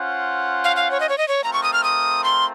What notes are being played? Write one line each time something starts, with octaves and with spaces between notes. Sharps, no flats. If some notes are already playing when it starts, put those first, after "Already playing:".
Already playing: C#4 F4 C5 F#5
F5
F5
C#5
D#5
C#5
D#5
C#5
A3 C4 F4 A#4 A#5
C#6
D#6
F6
D#6
C6